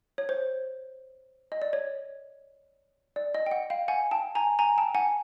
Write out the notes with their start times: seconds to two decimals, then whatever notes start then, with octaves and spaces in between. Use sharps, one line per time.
0.18 C#5
0.29 C5
1.52 D#5
1.62 D5
1.73 C#5
3.16 D5
3.35 D#5
3.46 G5
3.51 F#5
3.70 F5 G5
3.88 F#5 G#5
4.11 G5 A5
4.35 G#5 A#5
4.59 G#5 A#5
4.78 G5 A5
4.95 F#5 G#5